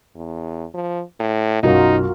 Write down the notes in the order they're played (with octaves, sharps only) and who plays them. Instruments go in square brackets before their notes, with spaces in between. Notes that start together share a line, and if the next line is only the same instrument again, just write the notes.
[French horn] E2
F3
A2
[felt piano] B1 F#2 [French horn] D#4 [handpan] F4 F#4 A#4